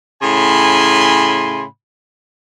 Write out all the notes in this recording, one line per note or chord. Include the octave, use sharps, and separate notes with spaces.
A2 C#3 G#5 B5 C6